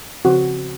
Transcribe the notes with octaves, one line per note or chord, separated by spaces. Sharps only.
C#3 F3 C4 F#4